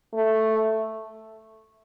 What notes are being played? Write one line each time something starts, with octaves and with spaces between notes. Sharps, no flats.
A3